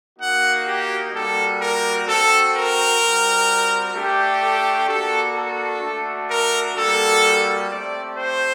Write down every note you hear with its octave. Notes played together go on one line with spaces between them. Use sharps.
A#3 D#4 F#4 F#5
G4
G3 A#3 F#4 A4
A#4
C4 F#4 A4
A#4
G3 C4 F#4
A3 D4 G4
A4
A#3 D4 F#4 A4
A4
A3 D4 F#4
A#4
G3 A#3 F#4 A4
A3 C4 G4 D5
C5